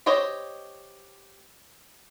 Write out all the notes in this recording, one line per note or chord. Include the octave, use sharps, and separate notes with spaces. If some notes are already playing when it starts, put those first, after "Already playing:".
G4 C5 C#5 D#5